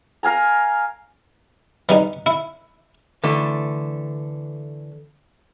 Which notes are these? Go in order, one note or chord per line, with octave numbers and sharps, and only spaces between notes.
A#4 F5 G#5 A#5
E3 G3 D#4
E4
D3 E3 A3